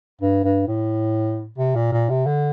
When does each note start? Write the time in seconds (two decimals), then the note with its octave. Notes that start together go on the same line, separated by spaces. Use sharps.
0.21 G2
0.44 G2
0.68 A2
1.58 C3
1.75 A#2
1.92 A#2
2.09 C3
2.26 D3